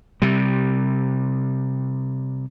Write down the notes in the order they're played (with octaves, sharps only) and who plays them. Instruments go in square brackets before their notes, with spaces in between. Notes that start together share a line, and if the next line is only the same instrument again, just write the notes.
[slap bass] C3 G3